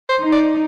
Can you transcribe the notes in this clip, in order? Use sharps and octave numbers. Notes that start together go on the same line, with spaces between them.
C5
D#4
D5